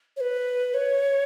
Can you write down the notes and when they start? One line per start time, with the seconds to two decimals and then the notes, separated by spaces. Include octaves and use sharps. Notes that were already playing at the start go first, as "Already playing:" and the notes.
0.17 C#5
0.20 B4
0.74 C#5